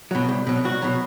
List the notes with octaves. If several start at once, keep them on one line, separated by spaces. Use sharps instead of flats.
B2 F#3
C2
B2 F#3
C2 F#4
B2 F#3